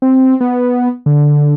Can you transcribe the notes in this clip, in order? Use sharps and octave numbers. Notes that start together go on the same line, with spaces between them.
C4
B3
D3